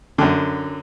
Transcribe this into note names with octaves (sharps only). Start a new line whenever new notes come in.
F#2 D3